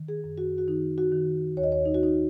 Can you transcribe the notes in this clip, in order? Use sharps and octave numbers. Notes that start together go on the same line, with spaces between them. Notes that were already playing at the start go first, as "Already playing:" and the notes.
Already playing: D#3
G#4
F#2
F#4
F#4
D#3 D#4
F#4
D#3
D#2 C#5
D#5
C#5
D#4
F#4
D#2 D#4